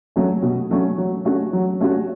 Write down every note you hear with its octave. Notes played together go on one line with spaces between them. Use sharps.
F#3 A3 C#4
B2
F#3 A3 C#4
F#3
A3 C#4 F#4
F#3
A3 C#4 F#4